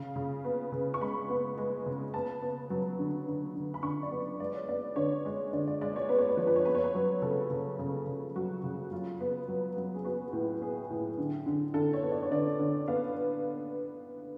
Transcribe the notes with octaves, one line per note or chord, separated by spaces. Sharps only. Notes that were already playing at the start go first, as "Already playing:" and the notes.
Already playing: C#3 F5
C#3
B3
C#3
C#6
G#3 B5
B3
G#3
C#3
B3 A5
B3
F#3
D3
D3
D3
B5
D3 C#6
D5
B3
G#3 D5
C#5
B3 D5
D3 C#5
G#3
D3 D5
D5
G#3 D5
C#5
B3 B4
C#5
B4
F3 C#5
B4
C#5
B3 B4
C#5
B4
F#3
C#3 A4
C#3
C#3
C#3
F#3 F#4
C#3
F#3 F4
B3
F#3
F#3
G#4
B3 F#4
A2
B3 G#4
A2
D3
D3
D3 A4
C#5
B3
D5
C#5
D3 D5
D3
B3 F5